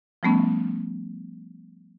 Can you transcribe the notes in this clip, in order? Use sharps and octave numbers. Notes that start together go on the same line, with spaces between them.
F3 G3 A3 B3 C#4